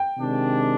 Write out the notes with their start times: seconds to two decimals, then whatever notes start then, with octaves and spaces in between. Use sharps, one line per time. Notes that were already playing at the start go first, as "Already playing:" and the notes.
Already playing: G5
0.17 C3 D#3 G#3 D4